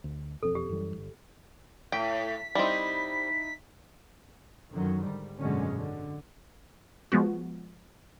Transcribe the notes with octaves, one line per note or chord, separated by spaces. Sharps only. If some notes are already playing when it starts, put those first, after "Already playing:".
D2
E1 F2 C4 A4
G4
F#2 E3 G3
G1
A2 G5 B6
G3 C4 D#4 E4
F#2 D3 D#3 F#3
G#2 G3
G#1 F#2 B2 D3 G#3 C#4
D3
F3 G#3 B3 F#4